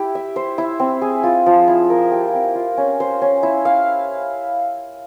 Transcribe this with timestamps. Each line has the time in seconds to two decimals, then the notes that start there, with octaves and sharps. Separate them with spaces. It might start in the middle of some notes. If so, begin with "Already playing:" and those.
Already playing: E4 G4
0.15 E5
0.36 C5
0.58 E4
0.80 C4
1.02 G#4
1.23 F4
1.46 F3
1.68 E4
1.90 A#4
2.11 G4
2.33 C4
2.55 F4
2.77 C#4
3.00 C5
3.22 C#4
3.43 E4
3.65 F5